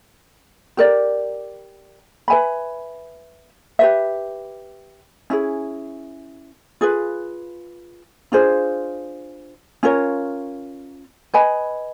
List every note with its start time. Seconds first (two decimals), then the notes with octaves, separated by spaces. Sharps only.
0.77 G4 A#4 D5
2.28 B4 E5 G#5 B5
3.79 G4 B4 E5
5.30 C#4 E4 G#4
6.81 F4 G#4 B4
8.32 D4 F4 G#4 C5
9.83 C#4 F4 A#4 C#5
11.34 B4 D#5 G#5 B5